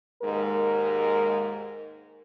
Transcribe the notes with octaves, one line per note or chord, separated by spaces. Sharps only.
D#2 G#2 G#3 A#4